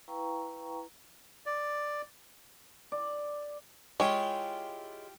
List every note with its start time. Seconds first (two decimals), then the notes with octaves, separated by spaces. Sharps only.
0.08 E4 B4 F5 G5 A#5 C#6
1.46 D5
2.92 D5
4.00 G#3 E4 F4 G4 C#5